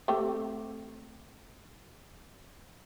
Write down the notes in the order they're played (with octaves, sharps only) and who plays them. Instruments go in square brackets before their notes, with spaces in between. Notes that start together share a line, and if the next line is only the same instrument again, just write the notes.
[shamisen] A3 C4 G4